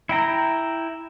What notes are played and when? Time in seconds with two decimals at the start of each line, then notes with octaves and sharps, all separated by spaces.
0.09 E4 G5 A#5